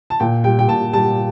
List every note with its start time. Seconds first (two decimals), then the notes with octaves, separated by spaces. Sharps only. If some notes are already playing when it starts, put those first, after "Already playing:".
0.10 A5
0.20 A#2 G5
0.44 G3 G5
0.59 G5
0.68 A#2 A5
0.93 G3 A5